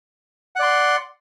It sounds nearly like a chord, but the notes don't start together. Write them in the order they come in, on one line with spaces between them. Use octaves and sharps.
F#5 D5 C6